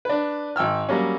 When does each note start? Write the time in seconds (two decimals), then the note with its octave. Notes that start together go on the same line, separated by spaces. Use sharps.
0.05 D4 B4
0.56 G#1 G5 E6 F6
0.89 F#3 G3 A#3 C#4